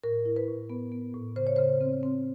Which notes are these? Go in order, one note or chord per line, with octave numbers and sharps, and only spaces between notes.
A2 A#4
E4
B4
A2
B3
B3
A2
C#3 C5
C#5
C#3 C5
C4
C4